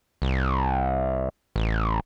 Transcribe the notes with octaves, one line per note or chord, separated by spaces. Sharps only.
C2
A1